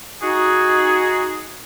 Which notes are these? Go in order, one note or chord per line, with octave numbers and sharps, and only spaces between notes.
D#4 F#4 G#4